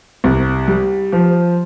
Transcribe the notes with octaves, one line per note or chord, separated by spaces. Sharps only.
C2
G3
F3